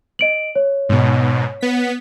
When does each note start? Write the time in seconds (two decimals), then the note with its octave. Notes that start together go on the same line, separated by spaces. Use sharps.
0.19 D#5 D7 F#7
0.55 C#5
0.89 G#2 B2
1.61 B3 B6